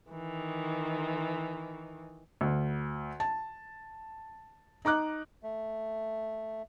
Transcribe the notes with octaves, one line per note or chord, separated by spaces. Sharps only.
D#3 E3
D2
A5
D#4 A#5 D6 F#6
A3